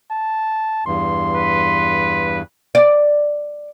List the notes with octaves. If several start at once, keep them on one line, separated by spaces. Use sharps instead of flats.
A5
E2 G2 C6
B4
D5